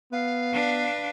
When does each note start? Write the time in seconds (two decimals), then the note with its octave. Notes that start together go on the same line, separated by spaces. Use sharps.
0.12 B3 F5
0.53 D4 B4